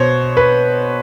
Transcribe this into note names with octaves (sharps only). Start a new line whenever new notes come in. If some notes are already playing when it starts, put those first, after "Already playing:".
Already playing: B2 C5 C#5
B4